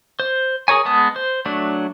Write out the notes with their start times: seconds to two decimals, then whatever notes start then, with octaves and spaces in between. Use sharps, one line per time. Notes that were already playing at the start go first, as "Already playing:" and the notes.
0.20 C5
0.68 G#4 A#4 C#5 G#5
0.85 G#3 B3 A5 D#6
1.16 C5
1.46 F#3 A3 D4